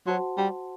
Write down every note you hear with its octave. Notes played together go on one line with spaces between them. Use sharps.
F#3 F#4 C5 F#5 A5 C6
G3